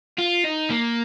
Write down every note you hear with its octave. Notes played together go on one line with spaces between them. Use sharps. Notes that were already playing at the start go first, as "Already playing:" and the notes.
F4
D#4
A#3